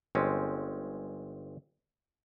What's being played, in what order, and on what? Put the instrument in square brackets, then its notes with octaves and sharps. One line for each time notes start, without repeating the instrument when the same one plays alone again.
[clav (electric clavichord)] G1 G#3 C4 C#4